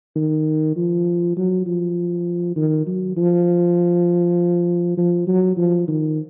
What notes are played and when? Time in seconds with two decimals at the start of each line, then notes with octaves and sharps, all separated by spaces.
0.16 D#3
0.76 F3
1.37 F#3
1.66 F3
2.56 D#3
2.87 F#3
3.17 F3
4.97 F3
5.27 F#3
5.57 F3
5.88 D#3